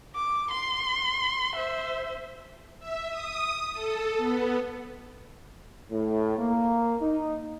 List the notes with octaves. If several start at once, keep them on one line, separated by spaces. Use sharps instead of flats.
D6
C6
C5 E5
E5
D#6
A4
B3
A2
A#3
D#4